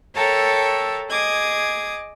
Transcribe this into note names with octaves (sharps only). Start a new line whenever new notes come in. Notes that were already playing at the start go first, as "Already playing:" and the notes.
A4 A#4 C#5 E5 G5 A5
G#4 D#5 D6 D#6 G#6